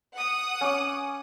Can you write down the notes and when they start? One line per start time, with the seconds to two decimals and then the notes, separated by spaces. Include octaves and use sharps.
0.15 F#5 D#6
0.61 C#4 D6